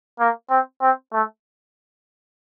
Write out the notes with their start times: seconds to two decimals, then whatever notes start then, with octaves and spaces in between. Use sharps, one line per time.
0.20 A#3
0.50 C4
0.81 C4
1.13 A3